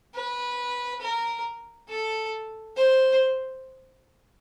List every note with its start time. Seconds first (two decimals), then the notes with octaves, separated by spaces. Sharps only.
0.14 B4
1.01 A#4
1.89 A4
2.76 C5